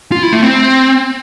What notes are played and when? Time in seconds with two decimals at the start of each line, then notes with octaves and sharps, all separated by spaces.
0.12 F4
0.23 E4
0.32 A3
0.43 C4